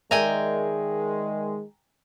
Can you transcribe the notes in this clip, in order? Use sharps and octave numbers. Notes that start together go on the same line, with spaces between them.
D#3 G#3 A#4 D5 E5 G5 G#5 A#5